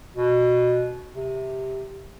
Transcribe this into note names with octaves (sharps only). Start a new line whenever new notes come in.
B2
C3